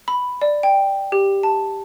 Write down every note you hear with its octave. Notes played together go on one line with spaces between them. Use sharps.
B5
D5
G5
G4
A5